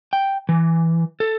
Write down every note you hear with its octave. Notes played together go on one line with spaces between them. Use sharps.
G5
E3
A4